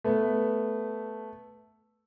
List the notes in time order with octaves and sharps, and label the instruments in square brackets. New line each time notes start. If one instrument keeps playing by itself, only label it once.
[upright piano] A3 B3